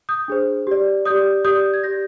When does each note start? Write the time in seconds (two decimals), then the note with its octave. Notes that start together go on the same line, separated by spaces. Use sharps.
0.09 D#6 G6
0.28 D4 G#4 C5
0.67 G4 D5
1.06 G4 D5 D#6 G6
1.45 G4 D5 D#6 G6
1.73 G#6
1.83 G4 D5 G6 A#6